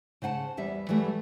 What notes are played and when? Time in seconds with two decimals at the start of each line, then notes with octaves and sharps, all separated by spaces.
0.22 C#3 C5 F#5 G#5 A5
0.57 E2 G3 E5
0.89 E3 F#3 G3 A3